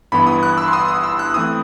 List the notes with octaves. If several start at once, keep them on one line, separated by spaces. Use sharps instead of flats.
G1 G2 E3 B3 E4 B5
D#6
F#6
E6
C6
D#6
D#6
E6
F#6
E3 A3 C4 E4 D#6